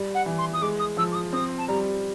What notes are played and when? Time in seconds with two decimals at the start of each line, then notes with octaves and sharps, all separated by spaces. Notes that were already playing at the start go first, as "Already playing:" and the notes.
Already playing: G3
0.14 F#5
0.26 E3
0.38 C6
0.53 D#6
0.62 G#3 D6
0.79 D#6
0.97 F3 E6
1.12 D6
1.15 D#6
1.33 C4 D#6
1.58 A5
1.68 G3 A#5